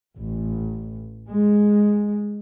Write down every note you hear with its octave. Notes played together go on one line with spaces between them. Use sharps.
A1
G#3